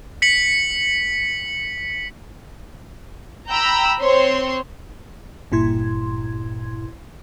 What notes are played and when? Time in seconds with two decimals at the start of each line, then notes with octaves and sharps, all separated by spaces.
0.22 B6 C#7 F#7
3.48 G5 A#5 B5 E6
4.01 C4 C5 C#5 C6
5.52 G1 G2 A#2 E4 C6 G#6